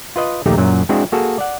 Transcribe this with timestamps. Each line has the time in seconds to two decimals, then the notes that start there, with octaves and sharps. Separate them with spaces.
0.16 F4 B4 D#5
0.46 A#1 D#2 A3 D#4 G4 A#5
0.57 F#2 A#2 F#3
0.89 G#3 C4 D4 E4 F#4 G#4
1.12 A#3 F#4 G#4 A4
1.38 D5 F#5